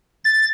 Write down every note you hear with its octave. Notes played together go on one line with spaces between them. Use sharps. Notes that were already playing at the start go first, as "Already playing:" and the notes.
A6